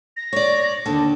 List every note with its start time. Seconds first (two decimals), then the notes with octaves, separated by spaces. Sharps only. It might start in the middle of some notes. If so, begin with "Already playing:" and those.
0.17 A#6
0.33 C#5 D5
0.85 D#2 D3 A5